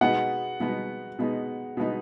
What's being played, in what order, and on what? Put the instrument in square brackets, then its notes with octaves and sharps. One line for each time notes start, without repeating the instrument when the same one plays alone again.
[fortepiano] B2 G#3 B3 D#4 [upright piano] F#5
[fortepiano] B2 G#3 B3 D#4
B2 G#3 B3 D#4
B2 G#3 B3 D#4